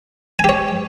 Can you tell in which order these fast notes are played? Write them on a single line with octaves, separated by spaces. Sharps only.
G#5 G4 C#5